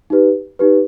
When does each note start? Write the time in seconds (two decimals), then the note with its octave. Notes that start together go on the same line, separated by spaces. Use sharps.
0.10 D#4 G4 B4
0.59 D#4 G4 B4